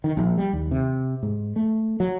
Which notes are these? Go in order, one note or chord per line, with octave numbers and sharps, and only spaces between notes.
D#3
A#1
G3
D#2
C3
G#2
A3
F#3